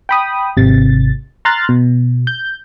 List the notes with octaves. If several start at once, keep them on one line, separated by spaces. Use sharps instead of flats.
G5 B5 D#6
G#1 C3 A6
A#5 C6 F6 F#6 A6
B2
G6